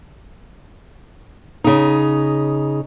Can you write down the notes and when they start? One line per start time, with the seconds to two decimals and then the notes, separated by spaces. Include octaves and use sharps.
1.64 C#3 D#4